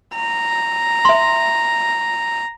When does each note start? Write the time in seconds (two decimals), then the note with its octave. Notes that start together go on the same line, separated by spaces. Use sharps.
0.16 A#5
1.05 E5 C6